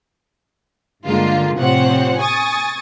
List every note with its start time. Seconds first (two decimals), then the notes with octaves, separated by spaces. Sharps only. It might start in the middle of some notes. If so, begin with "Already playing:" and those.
1.03 G2 D3 G#3 A#3 F4
1.57 A2 C3 F3 C4 C#5 F#5
2.19 G#5 C#6 D#6 A6